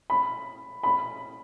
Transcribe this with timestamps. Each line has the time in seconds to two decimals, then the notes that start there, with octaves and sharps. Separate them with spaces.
0.10 B5
0.83 B5